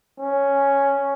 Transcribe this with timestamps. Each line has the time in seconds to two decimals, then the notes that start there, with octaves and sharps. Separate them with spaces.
0.20 C#4